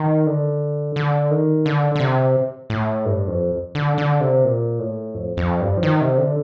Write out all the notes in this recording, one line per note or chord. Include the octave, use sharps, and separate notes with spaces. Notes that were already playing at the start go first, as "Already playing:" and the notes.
Already playing: D#3
D3
D3
D#3
D3
D3
C3
A2
G2
F2
D3
D3
C3
A#2
A2
F2
F2
G2
F3
D#3
C3
D3